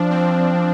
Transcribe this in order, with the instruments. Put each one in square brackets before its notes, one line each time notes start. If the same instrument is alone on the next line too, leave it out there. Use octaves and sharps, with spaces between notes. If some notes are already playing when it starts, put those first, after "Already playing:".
Already playing: [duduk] F3 [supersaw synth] D4
[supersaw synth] C4